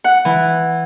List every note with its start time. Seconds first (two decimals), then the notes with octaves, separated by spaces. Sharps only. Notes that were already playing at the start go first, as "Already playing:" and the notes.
0.04 F#5
0.25 E3